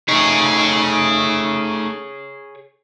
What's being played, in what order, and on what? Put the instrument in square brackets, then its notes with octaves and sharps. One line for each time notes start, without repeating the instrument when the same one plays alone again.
[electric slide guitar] A3 D#4 [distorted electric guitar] G#4 C#5